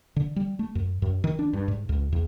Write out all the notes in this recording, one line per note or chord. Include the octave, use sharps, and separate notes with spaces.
D3
G3
A3
F#2
F#2
D#3
D4
G2
G#2
C#2
E2